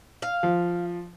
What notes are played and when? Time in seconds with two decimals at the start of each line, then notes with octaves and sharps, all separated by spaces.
0.22 F5
0.43 F3